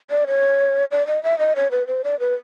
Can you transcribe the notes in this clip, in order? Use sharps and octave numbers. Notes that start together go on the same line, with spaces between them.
D5
C#5
D5
D#5
E5
D#5
C#5
B4
C5
D5
B4